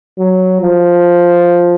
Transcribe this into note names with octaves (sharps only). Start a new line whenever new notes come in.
F#3
F3